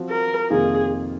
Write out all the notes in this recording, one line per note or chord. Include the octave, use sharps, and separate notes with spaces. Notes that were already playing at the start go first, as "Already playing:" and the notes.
Already playing: F3 C4 F#4
A#4
F2 C3 D#3 A#3 F4 G#4